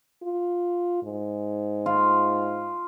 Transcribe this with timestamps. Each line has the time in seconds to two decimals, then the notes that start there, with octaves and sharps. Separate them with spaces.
0.23 F4
1.03 G#2
1.86 F4